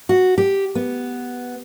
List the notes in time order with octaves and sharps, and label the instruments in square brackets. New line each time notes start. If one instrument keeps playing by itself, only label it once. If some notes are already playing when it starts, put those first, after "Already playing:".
[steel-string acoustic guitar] F#4
G4
B3